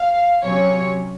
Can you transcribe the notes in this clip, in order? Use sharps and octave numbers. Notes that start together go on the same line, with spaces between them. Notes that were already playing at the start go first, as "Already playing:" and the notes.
Already playing: F5
C3 F#3 C#4 C#5